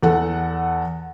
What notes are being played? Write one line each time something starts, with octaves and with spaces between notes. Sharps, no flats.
E2 A4 F#5